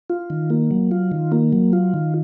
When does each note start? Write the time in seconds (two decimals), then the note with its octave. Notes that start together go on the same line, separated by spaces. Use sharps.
0.10 F4
0.30 D#3
0.50 A#3
0.71 F#3
0.91 F4
1.12 D#3
1.32 A#3
1.52 F#3
1.73 F4
1.94 D#3